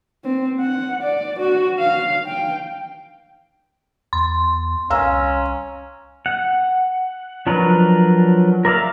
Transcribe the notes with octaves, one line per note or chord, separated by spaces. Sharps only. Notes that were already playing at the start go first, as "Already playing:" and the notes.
C4
F#5
D5
F#4
F5
G5
E2 C6
C2 C#4 F5 A#5 E6
F#5
F3 F#3 D4 A#4 B4
A#4 D5 E5 F5